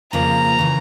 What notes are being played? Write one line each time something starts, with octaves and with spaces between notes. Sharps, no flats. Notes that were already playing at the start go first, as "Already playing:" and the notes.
F2 C#3 F3 A#3 A#5
C#3 E3